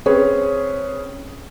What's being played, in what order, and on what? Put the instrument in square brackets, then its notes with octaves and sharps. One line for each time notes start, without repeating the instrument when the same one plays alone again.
[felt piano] C4 C#4 G#4 B4 C#5